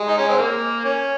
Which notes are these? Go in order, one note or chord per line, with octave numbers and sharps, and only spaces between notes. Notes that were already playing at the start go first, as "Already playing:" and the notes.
Already playing: G#3
D#4
C#4
C4
A#3
C#4